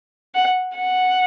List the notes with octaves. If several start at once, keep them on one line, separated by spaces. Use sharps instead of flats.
F#5
F#5